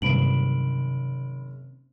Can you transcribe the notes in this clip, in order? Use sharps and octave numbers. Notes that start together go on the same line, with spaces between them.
F#1 G2 C3 D#3 C5 B5 D7 F#7